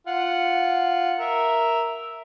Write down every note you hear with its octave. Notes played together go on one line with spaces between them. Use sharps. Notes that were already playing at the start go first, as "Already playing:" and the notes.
F4 F#5
A#4 E5